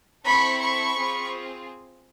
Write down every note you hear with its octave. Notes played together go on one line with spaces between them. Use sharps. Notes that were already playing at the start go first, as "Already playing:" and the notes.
C4 E4 A4 B5 C#6
B5 C#6
C4 F4 G#4